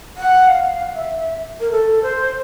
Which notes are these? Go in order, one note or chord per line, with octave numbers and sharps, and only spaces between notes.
F#5
F5
E5
A#4
A4
C5